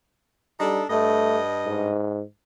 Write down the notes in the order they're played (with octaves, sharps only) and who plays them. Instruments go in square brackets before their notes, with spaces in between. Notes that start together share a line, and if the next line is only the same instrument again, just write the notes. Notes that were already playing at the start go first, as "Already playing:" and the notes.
[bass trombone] G3 [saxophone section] D4 D#4 A4
[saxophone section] G2 D#5 [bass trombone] A3
[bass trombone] G#2